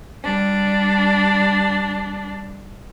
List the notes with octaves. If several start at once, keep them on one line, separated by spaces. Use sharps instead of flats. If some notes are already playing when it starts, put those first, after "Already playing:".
G3 D4